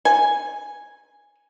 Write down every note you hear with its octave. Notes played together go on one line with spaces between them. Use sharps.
G#5